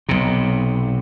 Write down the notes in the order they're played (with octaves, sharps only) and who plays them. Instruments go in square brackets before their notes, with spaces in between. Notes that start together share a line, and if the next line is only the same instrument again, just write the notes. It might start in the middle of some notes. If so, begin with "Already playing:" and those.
[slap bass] B1 C3